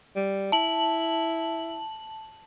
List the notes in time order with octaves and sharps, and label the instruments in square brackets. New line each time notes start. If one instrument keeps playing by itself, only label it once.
[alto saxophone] G3
[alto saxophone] E4 [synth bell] A5 F#7